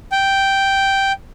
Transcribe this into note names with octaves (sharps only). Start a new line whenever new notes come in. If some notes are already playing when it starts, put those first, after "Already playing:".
G5